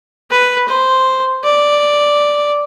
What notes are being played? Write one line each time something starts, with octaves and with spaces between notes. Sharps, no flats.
B4
C5
D5